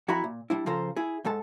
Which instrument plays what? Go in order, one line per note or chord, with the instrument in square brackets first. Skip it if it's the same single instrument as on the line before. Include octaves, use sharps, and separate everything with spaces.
[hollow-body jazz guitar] F2 E4 F#4 E5 A#5 B5
A#2
G3 D4 E4
C#3 F3 F4 A4 C5 A#5
E4 G#4
G#2 G#3 A4 A5